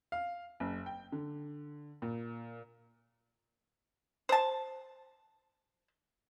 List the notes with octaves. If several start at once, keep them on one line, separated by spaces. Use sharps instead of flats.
F5
F#1
G5
D3
A#2
C5 A5